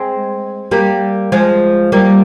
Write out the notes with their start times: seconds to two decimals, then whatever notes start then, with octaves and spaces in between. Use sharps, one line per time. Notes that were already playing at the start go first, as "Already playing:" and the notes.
Already playing: G#3 C4
0.71 G3 A#3
1.32 F3 G#3
1.92 G3 A#3